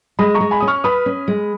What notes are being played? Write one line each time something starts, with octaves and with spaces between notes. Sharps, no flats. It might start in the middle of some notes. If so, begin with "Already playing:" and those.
G#3 B5 D#6
A#5 C#6
G#3
G#5 B5
C#4 D#6
C#6 F6
B4 B5 D#6
C#4
G#3